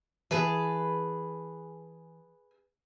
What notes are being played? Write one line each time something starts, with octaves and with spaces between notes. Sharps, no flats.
E3 G#4 B4 A5